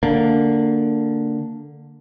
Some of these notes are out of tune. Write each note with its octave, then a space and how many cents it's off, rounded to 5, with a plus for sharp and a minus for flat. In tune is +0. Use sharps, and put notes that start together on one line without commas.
D3 -5 A#3 -20